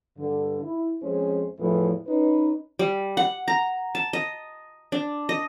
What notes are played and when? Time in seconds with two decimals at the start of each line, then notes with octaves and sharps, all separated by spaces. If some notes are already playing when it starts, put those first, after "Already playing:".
0.17 G2 D3
0.61 E4
1.02 F2 G#3 C#4 G#4 C5
1.58 E2 A2 E3 F3 E4 A4
2.07 C#4 D#4 B4
2.79 G3
3.17 F#5
3.48 A#5
3.95 A5
4.13 D#5
4.92 D4
5.29 D#5